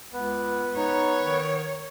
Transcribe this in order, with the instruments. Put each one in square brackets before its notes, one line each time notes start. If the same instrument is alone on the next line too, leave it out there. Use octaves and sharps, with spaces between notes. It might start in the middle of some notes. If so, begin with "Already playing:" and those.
[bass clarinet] C#2 [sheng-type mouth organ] B3 B4
[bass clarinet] D#4 [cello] C#5
[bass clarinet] D#3